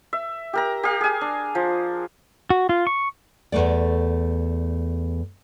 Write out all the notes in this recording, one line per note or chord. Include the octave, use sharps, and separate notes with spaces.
E5
G4 A#4 A#5
G4 F5
G#4 G#5
D4
F3
F#4
F4
C#6
E2 G2 A3 D5